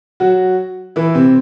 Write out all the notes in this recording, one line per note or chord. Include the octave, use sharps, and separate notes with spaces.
F#3 F#4
E3 E4
C3 C4